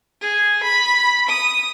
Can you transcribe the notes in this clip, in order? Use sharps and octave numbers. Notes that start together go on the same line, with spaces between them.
G#4
B5
D#6